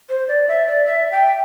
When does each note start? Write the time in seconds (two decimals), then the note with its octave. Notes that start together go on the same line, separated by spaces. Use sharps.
0.09 C5
0.28 D5
0.48 E5
0.67 D5
0.86 E5
1.12 G5